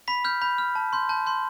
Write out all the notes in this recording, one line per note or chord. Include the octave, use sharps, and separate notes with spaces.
B5 B6
F6 G6
B5 G6
F6
A5
C6 G6
A5 G6
C6 G6